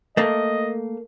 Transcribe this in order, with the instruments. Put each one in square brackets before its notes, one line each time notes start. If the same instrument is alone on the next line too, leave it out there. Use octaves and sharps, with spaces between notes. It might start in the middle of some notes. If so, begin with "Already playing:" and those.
[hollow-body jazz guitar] A3 A#3 [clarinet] D#5